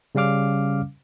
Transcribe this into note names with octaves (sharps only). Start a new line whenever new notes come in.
C#3 G3 C#4 F5 D6 F6